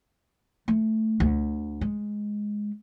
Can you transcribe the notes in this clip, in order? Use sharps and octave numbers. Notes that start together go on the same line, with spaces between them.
A3
D2
G#3